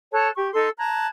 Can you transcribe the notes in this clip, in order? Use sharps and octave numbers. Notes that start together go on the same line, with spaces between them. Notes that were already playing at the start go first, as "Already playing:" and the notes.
A4 C#5 A5 F#6
G4 C#6
D#4 A4 C6 E6
A5 A#5 F#6 G#6